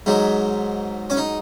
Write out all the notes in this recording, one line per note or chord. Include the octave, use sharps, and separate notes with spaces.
G#2 F#3 D#4
C#4
D#4